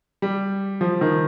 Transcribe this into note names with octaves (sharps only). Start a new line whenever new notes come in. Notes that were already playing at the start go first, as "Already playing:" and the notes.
G3
F3
D#3